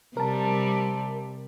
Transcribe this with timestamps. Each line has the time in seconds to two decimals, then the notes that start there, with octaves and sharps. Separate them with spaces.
0.17 C3 G3 A#4 A5